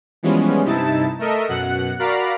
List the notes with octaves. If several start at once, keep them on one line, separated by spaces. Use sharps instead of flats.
E3 F3 G3 G#3 B3 C#4
G2 C3 D#4 E4 A5
A3 A4 A#4 D#5 E5
F#2 B2 F#5 F#6
F#4 A#4 D5 F5 A#5 B5